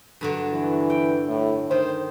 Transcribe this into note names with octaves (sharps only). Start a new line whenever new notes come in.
G2 D3 F#3
E3
G5
A2
D#3 C5